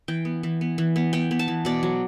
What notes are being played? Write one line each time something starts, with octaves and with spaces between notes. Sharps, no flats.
E3 G5
B3
E3
B3
E3
B3
B3 G5
B3
A5
E3
B2 D5
F#3